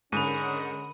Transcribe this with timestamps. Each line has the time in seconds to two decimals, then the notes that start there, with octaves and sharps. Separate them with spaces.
0.12 G#2 D3 G#3 C#4 A#4 F#5 B5 D#7